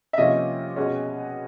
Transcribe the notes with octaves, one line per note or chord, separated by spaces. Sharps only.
E5
C3 F3 A#3 C#4 F4 D#5
B2 G#3 C#4